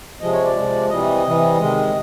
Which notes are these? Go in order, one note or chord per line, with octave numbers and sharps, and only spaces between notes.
C3 F3 G#3 D#5
C#5
D5
C3 F3 G#3
C3 E3 G3 D#5
C3 E3 G3
C3 D#3 G#3